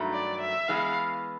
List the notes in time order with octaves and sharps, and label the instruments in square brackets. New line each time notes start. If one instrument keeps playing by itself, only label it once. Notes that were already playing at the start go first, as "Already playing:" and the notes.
Already playing: [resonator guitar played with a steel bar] G2 D#3 F#3 A3
[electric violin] D5
E5
[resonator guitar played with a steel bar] E3 G#3 B3 [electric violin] F5